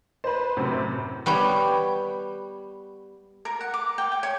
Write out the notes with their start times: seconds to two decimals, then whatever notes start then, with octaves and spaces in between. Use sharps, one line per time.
0.24 B4 C5
0.57 F#2 A2 C3
1.26 G3 B3 C#5 G5
3.45 A#4
3.61 F#5
3.74 D6
3.98 G5
4.12 G5
4.23 C#5